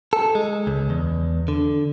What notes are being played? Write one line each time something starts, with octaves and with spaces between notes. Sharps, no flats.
A4
G#3
C#2
E2
D3